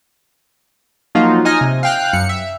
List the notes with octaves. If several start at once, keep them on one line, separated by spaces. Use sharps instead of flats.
F3 F#3 A#3 D#4 F4 F#4
D#4 D#5 G#5 F6 A#6
C3
F5 G5 F#6
F#2 C#7
E5